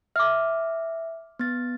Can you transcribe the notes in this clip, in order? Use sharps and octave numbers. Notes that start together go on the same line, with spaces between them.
E5 D6 F6
B3 A6